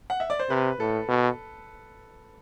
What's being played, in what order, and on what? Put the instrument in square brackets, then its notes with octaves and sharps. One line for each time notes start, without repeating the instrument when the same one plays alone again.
[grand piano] F#5
E5
D5
C5
[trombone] C3 [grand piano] B4
[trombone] A2 [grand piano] A4
[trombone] B2